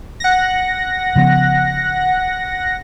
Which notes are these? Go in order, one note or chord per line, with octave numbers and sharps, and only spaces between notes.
F#5 A#6
C#3 F3 B3